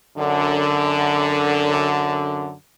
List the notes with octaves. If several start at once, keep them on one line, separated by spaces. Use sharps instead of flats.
F#2 D3